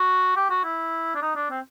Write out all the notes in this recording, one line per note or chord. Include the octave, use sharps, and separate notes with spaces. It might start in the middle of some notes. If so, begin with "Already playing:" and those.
Already playing: F#4
G4
F#4
E4
D4
D#4
D4
C4